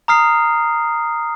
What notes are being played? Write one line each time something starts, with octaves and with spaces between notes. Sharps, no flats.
A#5 D#6 F6 C7